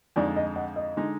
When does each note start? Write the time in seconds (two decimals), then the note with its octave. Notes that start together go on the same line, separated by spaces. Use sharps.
0.16 F2 D3 G#3 D#4 D5
0.36 D#5
0.56 D#5 F#5
0.76 D#5
0.97 D3 G#3 D#4